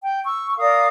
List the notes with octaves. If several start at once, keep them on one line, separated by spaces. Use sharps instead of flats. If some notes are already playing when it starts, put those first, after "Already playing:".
G5
C#6 E6
A#4 D5 F5 D#6